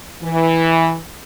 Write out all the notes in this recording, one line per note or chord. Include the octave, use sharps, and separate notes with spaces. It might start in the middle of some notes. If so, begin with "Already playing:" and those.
E3